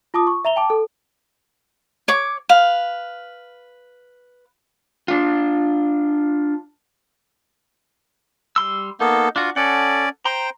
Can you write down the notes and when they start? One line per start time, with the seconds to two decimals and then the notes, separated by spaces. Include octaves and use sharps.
0.14 F4 A5 D6 D#6
0.27 C#6
0.45 E5 A#5 F7 G7
0.56 G5 A5 D6
0.70 A4
2.08 C#5 D6
2.49 B4 F5
5.08 D4 F4
8.56 G3 C6 E6
9.00 A#3 B3 D#4 A4
9.36 D4 F4 F#4
9.56 C#4 A4 D5 F#5
10.25 C5 G5 A#5 C6